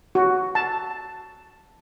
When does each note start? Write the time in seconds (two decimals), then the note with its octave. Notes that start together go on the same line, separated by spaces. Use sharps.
0.15 F#4
0.55 A5